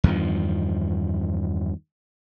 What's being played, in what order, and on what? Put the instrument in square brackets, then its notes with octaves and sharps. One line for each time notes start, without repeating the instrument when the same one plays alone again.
[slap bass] E2 G2 D#3 F3